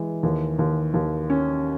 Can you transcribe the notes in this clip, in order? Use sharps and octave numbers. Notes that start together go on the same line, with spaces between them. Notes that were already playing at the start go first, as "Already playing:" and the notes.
Already playing: E3 G#3
D#2
D#2
D#2
C#4